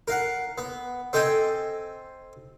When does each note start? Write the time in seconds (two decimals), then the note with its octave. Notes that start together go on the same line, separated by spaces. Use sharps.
0.08 A#4 F5 F#5
0.58 B3
1.13 C4 A4 D#5 G5 G#5